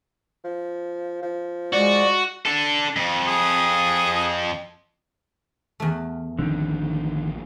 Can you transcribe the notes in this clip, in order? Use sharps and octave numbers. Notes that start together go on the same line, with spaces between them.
F3
F3
G#3 F#4 D5
D4 A4
F2
G#4
E2 A3
A1 D3 D#3 F3 C4